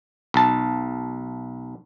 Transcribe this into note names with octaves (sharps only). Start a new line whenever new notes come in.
B1 A5